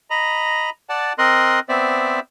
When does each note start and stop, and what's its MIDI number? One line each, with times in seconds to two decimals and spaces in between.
0.10 0.70 75
0.10 0.70 82
0.10 0.70 83
0.89 1.13 74
0.89 1.13 78
0.89 1.13 81
1.18 1.60 60
1.18 1.60 70
1.18 1.60 75
1.18 1.60 84
1.18 1.60 90
1.69 2.20 59
1.69 2.20 60
1.69 2.20 72
1.69 2.20 74
1.69 2.20 76